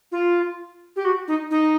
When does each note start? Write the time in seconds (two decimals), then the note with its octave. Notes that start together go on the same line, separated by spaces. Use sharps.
0.12 F4
0.96 G4
1.05 F#4
1.28 D#4
1.51 D#4